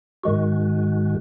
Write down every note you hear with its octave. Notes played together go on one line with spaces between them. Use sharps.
G#2 D#3 G#3 F#4